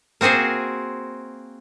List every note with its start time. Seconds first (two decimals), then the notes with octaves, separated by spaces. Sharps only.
0.21 A#3 C4 F#4 G#4 C5